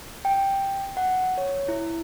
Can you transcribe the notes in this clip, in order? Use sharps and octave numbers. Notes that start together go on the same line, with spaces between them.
G5
F#5
C#5
E4